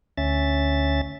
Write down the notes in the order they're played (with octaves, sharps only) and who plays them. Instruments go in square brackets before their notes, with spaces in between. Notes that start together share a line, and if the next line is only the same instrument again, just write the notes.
[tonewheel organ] D2 C#4 E5 A6